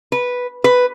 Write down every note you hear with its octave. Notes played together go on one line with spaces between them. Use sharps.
B4
B4